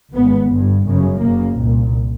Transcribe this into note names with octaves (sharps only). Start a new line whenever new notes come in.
G#1 G#2 B3
G1 G2
G1 F#2 C#3
F#1 F#2 C#3 A#3
C2 A#2